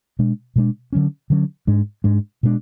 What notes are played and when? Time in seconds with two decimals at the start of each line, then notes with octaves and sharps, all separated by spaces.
0.19 B2 G#3 D4
0.56 B2 G#3 D4
0.93 D3 F#3 C#4
1.30 D3 F#3 C#4
1.67 G#2 G#3 D4
2.04 G#2 G#3 D4
2.43 B2 G#3 D4